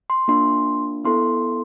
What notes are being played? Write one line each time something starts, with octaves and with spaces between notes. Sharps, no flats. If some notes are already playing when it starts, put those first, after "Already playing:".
C6
A#3 D4 F4 C6
B3 E4 A4 C6